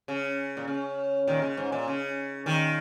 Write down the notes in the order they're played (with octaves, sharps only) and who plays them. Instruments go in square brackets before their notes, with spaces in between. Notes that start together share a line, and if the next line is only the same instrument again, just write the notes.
[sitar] C#3
A#2
C#3
A#2 D#3
C#3
G#2
A#2
C#3
A#2 D#3